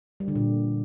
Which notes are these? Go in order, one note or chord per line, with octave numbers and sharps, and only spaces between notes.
G3
D3
A#2